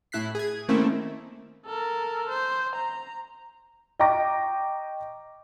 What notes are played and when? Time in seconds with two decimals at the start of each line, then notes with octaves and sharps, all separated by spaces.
0.12 A2 E4 F#6 B6 C7
0.35 G#4 G#6
0.69 D#3 A3 A#3 C4 C#4 E4
1.66 A4 A#4
2.29 C5
2.75 A#5
3.99 D#5 G5 A#5 C#6 D6 A#6